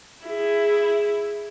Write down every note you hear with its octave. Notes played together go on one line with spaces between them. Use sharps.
E4 G#4